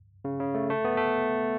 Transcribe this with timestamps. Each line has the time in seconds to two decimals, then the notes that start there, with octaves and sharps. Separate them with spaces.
0.25 C#3
0.40 C#3
0.54 A3
0.70 A3
0.85 B3
0.97 A3